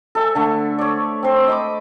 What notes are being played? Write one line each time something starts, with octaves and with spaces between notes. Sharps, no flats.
A4 E5 G#5
D3 A3
C#5 D5
C4 C5
D#5 B5 D6